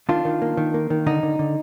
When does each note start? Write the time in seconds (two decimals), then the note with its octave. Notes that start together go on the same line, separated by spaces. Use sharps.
0.09 D#3 D4 F4
0.25 D#3
0.42 A#3
0.57 D#3
0.74 A#3
0.90 D#3
1.06 D3 D#4
1.23 D3
1.39 D3